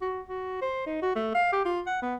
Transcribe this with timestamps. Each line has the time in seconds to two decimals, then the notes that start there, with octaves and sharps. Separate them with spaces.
0.02 F#4
0.29 F#4
0.62 C5
0.87 D#4
1.02 F#4
1.16 A3
1.35 F5
1.53 G4
1.65 F4
1.87 F#5
2.02 B3